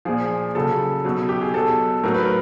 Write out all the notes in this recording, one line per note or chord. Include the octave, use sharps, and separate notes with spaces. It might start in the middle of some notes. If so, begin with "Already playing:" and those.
A#2 F3 G#4
C#3 F#3 A4
B2 F#3
G4
G#4
B2 F#3 A4
A2 F#3 A#4
B4
A#4